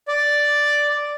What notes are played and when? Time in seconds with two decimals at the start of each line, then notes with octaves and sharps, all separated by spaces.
0.08 D5